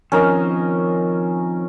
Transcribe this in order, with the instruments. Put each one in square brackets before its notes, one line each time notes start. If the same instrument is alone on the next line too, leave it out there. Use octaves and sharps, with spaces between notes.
[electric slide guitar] D#3 F3 C4 [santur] C#4 A#4 D#5